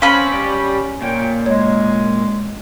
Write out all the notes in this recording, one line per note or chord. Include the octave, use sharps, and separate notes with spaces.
C4 C#4 B4 F5 B5
G4 D5
A#2 C#5 G5
G#3 C#5